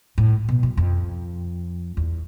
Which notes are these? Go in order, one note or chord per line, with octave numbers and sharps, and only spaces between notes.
A2
B2
F#2
F2
E2